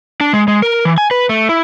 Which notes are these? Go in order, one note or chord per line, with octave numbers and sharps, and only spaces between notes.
D4
G#3
G#3
A#4
E3
G#5
B4
A3
E4